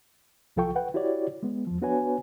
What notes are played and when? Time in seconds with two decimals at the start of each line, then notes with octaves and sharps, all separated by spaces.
0.56 C2 F3 F4 A4 G5 C#6
0.76 B4 F#5 G5
0.94 E4 F#4 G4 C#5 D5
1.43 G#3 B3
1.67 E2 F3
1.82 B3 D4 F#4 B4 C#5 G#5